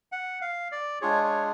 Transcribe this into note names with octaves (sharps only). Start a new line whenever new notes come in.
F#5
F5
D5
G#3 D4 F4 G#4 C#5
C#5